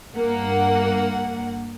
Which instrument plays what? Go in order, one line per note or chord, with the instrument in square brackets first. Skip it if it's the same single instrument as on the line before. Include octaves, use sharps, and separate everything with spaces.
[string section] G2 A#3 F#5